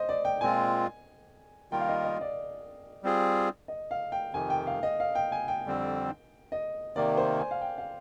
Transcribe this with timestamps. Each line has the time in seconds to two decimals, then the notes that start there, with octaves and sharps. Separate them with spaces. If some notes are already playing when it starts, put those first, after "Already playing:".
Already playing: C5 D#5
0.09 D5
0.25 G5
0.41 A#2 G#3 C4 F4 G#5
1.71 D#3 G3 A#3 F4 A#4 G5
1.81 F5
1.88 D#5
2.04 D#5
2.21 D5
3.03 G3 C4 F4 G#4
3.68 D#5
3.91 F5
4.12 G5
4.33 F2 C3 D#3 G#5
4.50 G5
4.67 F5
4.83 D#5
5.00 F5
5.15 G5
5.32 G#5
5.48 G5
5.65 F2 D3 G3 C4
6.52 D#5
6.96 C3 D#3 A#3 D5
7.17 C5
7.39 G#5
7.51 F5
7.61 G5
7.78 F5